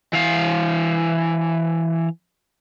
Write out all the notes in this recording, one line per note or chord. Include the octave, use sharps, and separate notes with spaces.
E3 F5